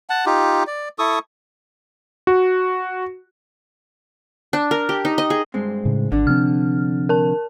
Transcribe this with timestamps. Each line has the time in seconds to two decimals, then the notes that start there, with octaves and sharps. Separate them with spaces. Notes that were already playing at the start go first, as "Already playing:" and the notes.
0.10 F#5 A5
0.26 D#4 F4 G4
0.67 D5
0.99 E4 A4 C#6 D#6
2.27 F#4
4.53 D4
4.71 A#4
4.89 G4
5.05 D#4
5.18 D#5
5.30 G#4
5.54 G2 G#3 C4
5.85 A2 C#3
6.12 G#1 D3 D4
6.27 C3 F3 C4 F6
7.09 A#4 A5